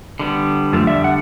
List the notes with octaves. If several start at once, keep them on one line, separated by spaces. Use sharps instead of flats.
D3 G3 B3
F#2 F3 A3
F2 D5 E5
F#5